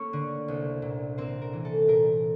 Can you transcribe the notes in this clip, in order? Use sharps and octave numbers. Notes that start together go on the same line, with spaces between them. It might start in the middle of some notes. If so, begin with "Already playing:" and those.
Already playing: A3 A#3 C#4 C#5
D3
C2
A#2
A#3 C4 C5
A#4
E3
A4
A#2 A#4